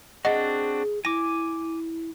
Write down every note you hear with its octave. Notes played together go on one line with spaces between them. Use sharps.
C4 D4 F#4 G#4 D#5 F#5
E4 G#5 D6 A#6